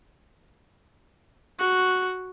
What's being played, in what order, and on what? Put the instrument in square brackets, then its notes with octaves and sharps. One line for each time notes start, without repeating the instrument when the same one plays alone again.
[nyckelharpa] F#4